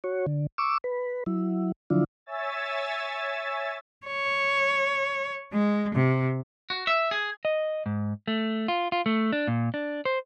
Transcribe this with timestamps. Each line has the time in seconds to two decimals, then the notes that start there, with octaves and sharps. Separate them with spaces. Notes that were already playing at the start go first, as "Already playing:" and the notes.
0.04 F#4 C#5
0.26 D3
0.58 C#6 D6 E6
0.84 B4
1.26 F#3 E4
1.90 D3 F3 F#3 D4 E4 F4
2.26 C#5 E5 G#5 E6 A6
4.07 C#5
5.53 G#3
5.95 C3
6.70 F#4
6.87 E5
7.11 G#4
7.45 D#5
7.86 G#2
8.28 A3
8.68 F4
8.92 F4
9.06 A3
9.32 D4
9.48 A#2
9.74 D4
10.05 C5